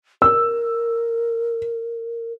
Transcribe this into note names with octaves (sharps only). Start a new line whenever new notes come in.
A#4 E6